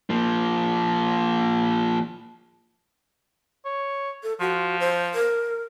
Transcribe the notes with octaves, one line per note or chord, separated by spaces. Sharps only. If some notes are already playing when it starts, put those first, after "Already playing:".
F3 A#3
C#5
A4
F3 F#4
C5
A#4